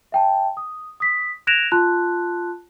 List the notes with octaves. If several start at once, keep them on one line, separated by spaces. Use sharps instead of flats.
E5 G5 A5
D#6
D#6 B6
F#6 G#6 A#6 D7 E7 F7
F4 A5 C6 F#6